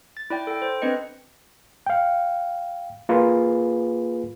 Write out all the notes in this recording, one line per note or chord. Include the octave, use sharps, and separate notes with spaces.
A6
E4 D5 G5
A4 G5
C5
C4 D4 B4 D#5 C#7
F5 G5
A#3 F4 G#4 B4